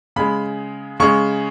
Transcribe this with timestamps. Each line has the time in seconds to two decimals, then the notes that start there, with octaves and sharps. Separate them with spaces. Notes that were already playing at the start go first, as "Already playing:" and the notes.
0.16 C#3 G#3 B5
1.00 C#3 G#3 C#6